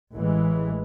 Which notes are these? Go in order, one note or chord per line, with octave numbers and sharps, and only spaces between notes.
A1 E3 G#3